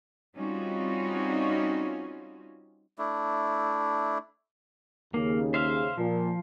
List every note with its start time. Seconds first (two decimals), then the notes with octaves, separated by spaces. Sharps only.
0.35 G3 C4 C#4 D#4 F4 F#4
2.98 A3 D4 E4
5.14 D#2 C#3 A#3
5.54 C5 E5 F5
5.98 A#2 F3